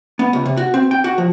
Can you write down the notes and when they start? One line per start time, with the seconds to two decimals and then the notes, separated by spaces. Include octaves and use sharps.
0.19 B3
0.33 C#2
0.45 C3
0.57 F#4
0.74 C4
0.91 G5
1.04 F#4
1.18 F3